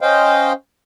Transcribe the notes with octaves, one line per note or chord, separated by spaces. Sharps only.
C#4 C5 D#5 F5 G5